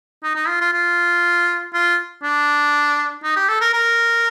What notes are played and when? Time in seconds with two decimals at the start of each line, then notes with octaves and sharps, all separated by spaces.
0.23 D#4
0.36 D#4
0.48 F4
0.61 F4
0.73 F4
1.73 F4
2.23 D4
3.23 D#4
3.36 G4
3.48 A4
3.61 A#4
3.73 A#4